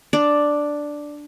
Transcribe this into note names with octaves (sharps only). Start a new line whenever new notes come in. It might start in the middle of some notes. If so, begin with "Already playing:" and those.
D4 D5